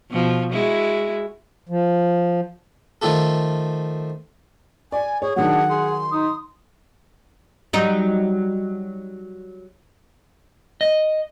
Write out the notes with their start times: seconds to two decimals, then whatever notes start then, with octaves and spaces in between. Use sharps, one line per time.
0.10 B2 F3
0.52 G#3 E4 F#4
1.69 F3
3.02 D#3 F3 A3 A4
4.92 D5 G#5
5.22 G#4 C#5
5.36 D#3 F#3 D4 G#4 F#5
5.69 G#4 C6
6.12 D#4 D#6
7.73 F#3 G3 D#4
10.81 D#5